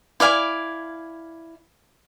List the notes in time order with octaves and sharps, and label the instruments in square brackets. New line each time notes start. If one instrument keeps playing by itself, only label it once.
[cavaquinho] E4 D5 F5 G#5